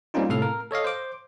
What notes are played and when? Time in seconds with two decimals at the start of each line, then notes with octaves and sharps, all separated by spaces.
0.14 G3 A#3 C4 C#4 D#4 F4
0.29 A2 C3 A4 F5 F6
0.42 A#4
0.71 A4 C#5 D#5 F5
0.84 C5 D6